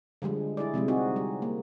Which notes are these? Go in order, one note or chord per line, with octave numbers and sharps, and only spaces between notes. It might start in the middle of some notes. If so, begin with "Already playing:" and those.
D3 F3 G3 G#3
E4 G#4 D5
C3 F3 G3 G#3
C4 D#4 F#4 G#4
G3
A#3